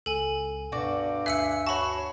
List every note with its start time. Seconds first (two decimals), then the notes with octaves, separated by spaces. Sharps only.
0.06 C#2 A4 G#5
0.72 G2 B2 D4 F#4 D5
1.26 D2 E5 G#5 E6 F#6 C7 C#7
1.67 F#4 C#5 A5 B5